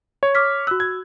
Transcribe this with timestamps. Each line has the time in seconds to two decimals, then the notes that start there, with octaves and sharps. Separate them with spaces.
0.23 C#5
0.35 D6 F6 B6
0.67 F#4 E6 F#6
0.80 G#6